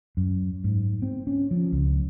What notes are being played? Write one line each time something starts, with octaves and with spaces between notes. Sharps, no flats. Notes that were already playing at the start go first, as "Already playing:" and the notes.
F#2
G#2
C4
C#4
F3
C#2